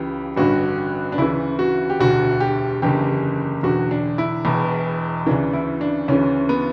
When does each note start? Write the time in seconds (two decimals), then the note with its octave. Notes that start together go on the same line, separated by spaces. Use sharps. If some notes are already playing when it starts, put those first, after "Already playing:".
Already playing: C#2 C#3 E3 G4
0.37 A1 G2 D3 F#4
1.12 D4
1.18 D2 C#3 E3 E4
1.59 F#4
1.90 G4
2.00 E1 D2 D3 F#4
2.40 G4
2.82 F#1 E2 D3 G4
3.63 E1 E2 D3 F#4
3.91 D4
4.18 E4
4.45 E1 E2 B2
5.26 D2 C#3 E3 D4
5.53 E4
5.81 D4
6.08 D2 C#3 E3 C#4
6.49 B3